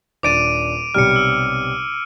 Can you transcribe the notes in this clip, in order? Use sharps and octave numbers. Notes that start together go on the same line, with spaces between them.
D#1 D4 D6 A6 D7 D#7
B1 C3 G3 F6 C#7
E6